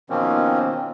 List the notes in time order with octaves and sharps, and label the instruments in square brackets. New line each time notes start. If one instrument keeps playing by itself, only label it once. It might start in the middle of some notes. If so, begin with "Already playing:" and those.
[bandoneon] B2 D#3 F3 A#3 C4 C#4